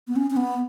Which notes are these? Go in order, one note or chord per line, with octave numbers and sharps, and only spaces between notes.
B3
C#4
C#4
B3